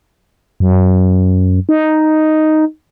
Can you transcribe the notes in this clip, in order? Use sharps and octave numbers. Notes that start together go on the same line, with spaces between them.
F#2
D#4